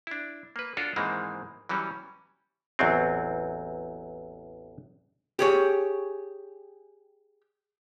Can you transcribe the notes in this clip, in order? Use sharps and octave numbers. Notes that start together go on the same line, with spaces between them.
D4 E4
A#3 B4
D4 F4 F#4 A4 C#5
G#2 D#3 E3 G#3 A#3 C4
E3 F#3 G3 C#4
A1 E2 F#3 C4
G4 G#4 C#5